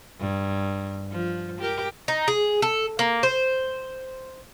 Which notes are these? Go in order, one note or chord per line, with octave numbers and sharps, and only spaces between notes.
G2
F3
G4 A#4
D#4
G#4
A4
A#3
C5